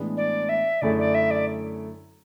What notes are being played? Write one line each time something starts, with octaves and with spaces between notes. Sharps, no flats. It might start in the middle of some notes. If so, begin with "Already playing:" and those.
Already playing: A2 E3 G#3 B3 D4
D5
E5
F#2 D3 A3 E4 G#4 D5
D5
E5
D5